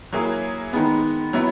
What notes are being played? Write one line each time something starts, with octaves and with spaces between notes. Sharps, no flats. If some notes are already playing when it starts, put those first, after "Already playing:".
F#3 A#3 E4 G#4
D#3 G#3 B3
F#3 B3 E4